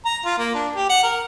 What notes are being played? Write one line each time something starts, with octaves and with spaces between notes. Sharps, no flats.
A#5
F4
A#3
D4
G4
F#5
A#4